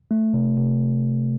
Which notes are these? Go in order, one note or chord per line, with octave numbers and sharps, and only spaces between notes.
A3
C3
C3